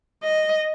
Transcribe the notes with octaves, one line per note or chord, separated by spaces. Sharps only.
D#5